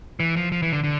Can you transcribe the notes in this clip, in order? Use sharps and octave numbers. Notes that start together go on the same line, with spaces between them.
E3
F3
F3
E3
D3
D3